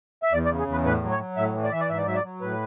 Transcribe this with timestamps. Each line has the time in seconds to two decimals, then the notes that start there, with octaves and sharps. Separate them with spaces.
0.23 E5
0.32 E2 D5
0.45 D5
0.50 C#3
0.59 G#4
0.67 E2 B4
0.85 A2 B4
1.03 F#3
1.11 C#5
1.19 F#3
1.37 A2 E5
1.55 E3
1.63 D5
1.72 E3 E5
1.80 D5
1.89 G#2 E5
1.98 D5
2.06 F#3 E5
2.15 D5
2.24 F#3
2.41 A2 B4